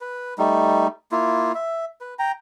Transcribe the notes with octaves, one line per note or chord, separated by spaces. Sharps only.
B4
G3 A3 D#4
A#3 E4 F4
E5
B4
G5 A#5